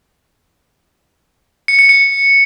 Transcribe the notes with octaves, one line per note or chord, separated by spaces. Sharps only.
C#7
C#7
C#7